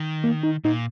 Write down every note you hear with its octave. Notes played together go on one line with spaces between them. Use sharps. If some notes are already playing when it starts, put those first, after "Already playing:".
Already playing: D#3
A#3
D#4
A#2 D#4